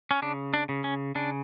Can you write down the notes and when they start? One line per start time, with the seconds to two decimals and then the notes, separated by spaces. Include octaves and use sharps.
0.11 C#4
0.22 C#3 D4
0.54 D4
0.69 C#3
0.84 C#4
1.15 C#3 D4